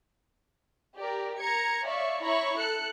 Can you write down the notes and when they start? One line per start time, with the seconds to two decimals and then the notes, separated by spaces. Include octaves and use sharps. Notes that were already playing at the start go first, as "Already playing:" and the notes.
0.95 G4 A#4 D5
1.40 A#4 A#5 G#6 C#7
1.84 C#5 D5 E5 F5 C#6
2.22 E4 C#5 E5 A#5 B5 C#6
2.58 A4 F#6 C#7